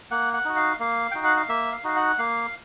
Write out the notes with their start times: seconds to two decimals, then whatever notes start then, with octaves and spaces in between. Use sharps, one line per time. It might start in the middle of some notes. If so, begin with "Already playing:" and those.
0.11 A#3 F#5
0.33 F#5
0.45 D#4 F#4
0.56 F5
0.80 A#3 F5
1.11 D#4 F#4 G5
1.24 F#5
1.36 F5
1.49 A#3 E5
1.72 F5
1.84 D#4 F#4 F5
1.96 F#5
2.18 A#3 F5